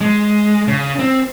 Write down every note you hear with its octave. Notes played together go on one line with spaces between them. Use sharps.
G#3
C#3
C4